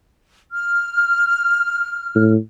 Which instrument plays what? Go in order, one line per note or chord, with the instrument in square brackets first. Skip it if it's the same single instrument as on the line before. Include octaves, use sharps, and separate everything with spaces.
[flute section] F6
[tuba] A2